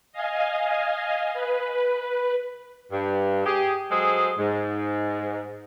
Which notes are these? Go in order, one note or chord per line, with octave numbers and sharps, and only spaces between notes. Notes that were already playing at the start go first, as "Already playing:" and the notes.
D#5 F5 G#5
B4
G2
G4 G#4
F#3 G#3 G#4 A4 C5
G#2